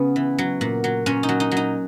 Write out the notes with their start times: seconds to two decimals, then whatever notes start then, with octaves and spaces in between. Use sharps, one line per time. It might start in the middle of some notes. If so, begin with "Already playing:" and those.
Already playing: C#3 B3 C#4
0.16 E3
0.38 F#3
0.61 A#2
0.84 F#3
1.06 A#2 C#4
1.23 D#4
1.29 F#3
1.40 D#4
1.51 F#3
1.57 D#4